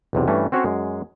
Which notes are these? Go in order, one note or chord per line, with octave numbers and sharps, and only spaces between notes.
B1 E2 C3
G2 E3 A3 C#4
C4 C#4 F#4 A4 C5 C#5
F#2 G#3